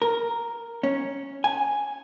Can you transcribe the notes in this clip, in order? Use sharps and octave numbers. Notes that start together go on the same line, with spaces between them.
A#4
C#4
G#5